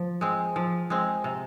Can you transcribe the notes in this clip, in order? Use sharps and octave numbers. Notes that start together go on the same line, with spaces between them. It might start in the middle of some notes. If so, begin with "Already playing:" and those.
Already playing: F3
G#3 C4
F3
G#3 C4
C3